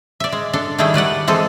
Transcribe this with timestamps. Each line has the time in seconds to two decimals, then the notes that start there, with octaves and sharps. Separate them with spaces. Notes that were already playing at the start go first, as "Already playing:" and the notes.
0.20 D5 E5
0.32 G#3
0.53 D4 A4
0.78 D#3 G3 A3 E4 G#4 G5
0.94 G3 B4 D5 F#5
1.28 E3 G#3 C4 A4